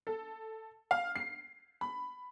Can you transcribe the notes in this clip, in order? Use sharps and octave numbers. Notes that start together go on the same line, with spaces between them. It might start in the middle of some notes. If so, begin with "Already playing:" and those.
A4
F5
C7
B5